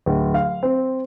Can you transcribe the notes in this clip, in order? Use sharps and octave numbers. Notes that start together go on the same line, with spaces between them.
D1
F5
C4